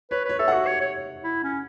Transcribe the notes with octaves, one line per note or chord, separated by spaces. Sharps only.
B4 C#5
B4 C#5
A4 E5
F#4 F#5
C#5
C#5
E4
C#4